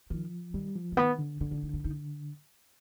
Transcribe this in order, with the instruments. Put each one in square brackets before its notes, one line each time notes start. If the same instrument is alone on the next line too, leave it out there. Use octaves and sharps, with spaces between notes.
[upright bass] D#3 [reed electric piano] F3
[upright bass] D#3 [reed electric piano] G3
[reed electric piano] F3
[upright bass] G#3
[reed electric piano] D#3 [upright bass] B3
[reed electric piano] D3
[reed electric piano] D3 [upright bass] B3
[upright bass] D4
D#4
D4
D#4